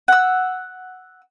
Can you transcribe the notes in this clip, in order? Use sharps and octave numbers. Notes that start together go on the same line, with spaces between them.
F#5 E6